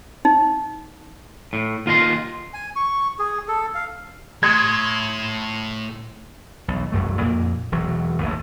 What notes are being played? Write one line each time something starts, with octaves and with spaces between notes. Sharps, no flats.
D#4
A2
D#2 F4 A#4 D#5 C6
G#5
C#6
G#4
A4
F5
A2 C6 D#6 G#6
B1 E2
E1 C2 F#2 A3
F2 A#2 A#3
E1 E2 F#3
A1 D#2 E3